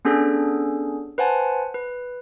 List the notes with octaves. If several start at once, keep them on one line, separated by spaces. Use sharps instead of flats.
B3 C#4 D4 G#4 A4
B4 C5 F#5 G#5 A5
B4